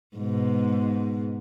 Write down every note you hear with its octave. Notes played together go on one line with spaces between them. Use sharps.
G#2 B2